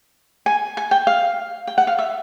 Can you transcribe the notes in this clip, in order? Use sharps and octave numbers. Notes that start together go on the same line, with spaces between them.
G#5
G#5
G5
F5
G5
F#5
F5
E5